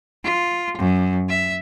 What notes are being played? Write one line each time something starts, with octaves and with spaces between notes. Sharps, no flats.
F4
F#2
E5